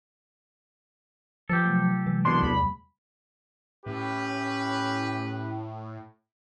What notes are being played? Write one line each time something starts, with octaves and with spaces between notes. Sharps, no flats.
F3 F4 G4 A4 B4
C3 F#3 A3
C3 E3 G3 G#3
C2 B2 D4 C6
E2 B5
A2 C#4 G4 B4